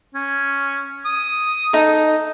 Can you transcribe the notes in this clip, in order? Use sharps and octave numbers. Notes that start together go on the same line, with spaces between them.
C#4
D#6
D#4 A4